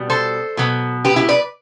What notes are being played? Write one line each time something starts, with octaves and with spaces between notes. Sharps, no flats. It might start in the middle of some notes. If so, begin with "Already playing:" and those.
Already playing: B2 G3 B3
A4 C5
B2 F#3 B3
G4 B4
E4 G4
B4 D5